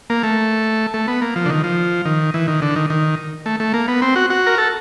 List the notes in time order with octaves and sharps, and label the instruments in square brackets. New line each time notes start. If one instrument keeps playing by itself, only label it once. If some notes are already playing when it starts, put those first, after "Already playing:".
[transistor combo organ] A#3
A3
A3
B3
A#3
F3
D3
D#3
F3
D#3
E3
D#3
D3
D#3
D#3
A3
A3
A#3
B3
C4
F#4
F#4
A#4
A4